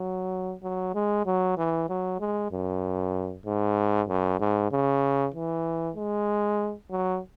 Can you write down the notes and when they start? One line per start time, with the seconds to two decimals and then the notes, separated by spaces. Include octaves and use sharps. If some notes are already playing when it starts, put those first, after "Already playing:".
Already playing: F#3
0.63 F#3
0.94 G#3
1.26 F#3
1.57 E3
1.89 F#3
2.20 G#3
2.52 F#2
3.46 G#2
4.08 F#2
4.40 G#2
4.71 C#3
5.34 E3
5.96 G#3
6.91 F#3